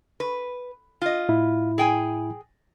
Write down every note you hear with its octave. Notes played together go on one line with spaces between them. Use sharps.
B4
F4 D#5
A2 E4 B5
G#4 G5 G#5